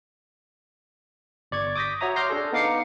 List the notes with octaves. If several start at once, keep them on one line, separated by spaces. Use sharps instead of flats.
G1 D5 C#6 G#6
D6 D#6 G6 A#6 B6
F#4 C#5 E5 A#5 D#6
C6 D6 F6 G6 A#6 C7
D4 G#4 A4
B3 D#4 F5 D6 C7 C#7